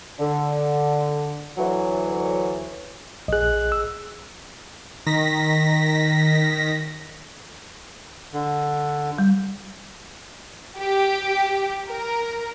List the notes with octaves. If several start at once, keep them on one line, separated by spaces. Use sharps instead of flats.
D3
D2 E3 F#3
A#1 G#4 D#5 F#6
E6
D#3 A#6 B6
D3
G3
G4
A#4